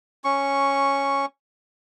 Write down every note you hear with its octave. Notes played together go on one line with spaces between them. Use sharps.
C#4 C#6